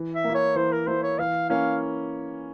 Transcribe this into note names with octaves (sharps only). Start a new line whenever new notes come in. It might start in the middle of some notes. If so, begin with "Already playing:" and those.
Already playing: E3
E5
A#3
E4
C#5
E3 C5
A#4
A#3 E4 C5
C#5
E3 F5
A#3 C#4 E4 F5